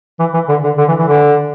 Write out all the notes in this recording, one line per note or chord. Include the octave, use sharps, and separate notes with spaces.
E3
E3
D3
D3
D3
E3
E3
D3